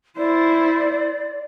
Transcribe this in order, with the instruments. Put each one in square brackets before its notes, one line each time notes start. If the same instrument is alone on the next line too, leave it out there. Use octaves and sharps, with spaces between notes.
[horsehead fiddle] E4 C5 [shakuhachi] D5